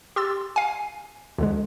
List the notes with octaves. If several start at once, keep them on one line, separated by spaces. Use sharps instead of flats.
G4 C6 E6 A6
F5 G#5
D2 D3 G#3